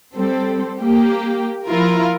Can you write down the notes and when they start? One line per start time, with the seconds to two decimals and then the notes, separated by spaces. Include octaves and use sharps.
0.16 G3 C4 A4
0.81 A#3 G4
1.67 F3 E4 F4 A#4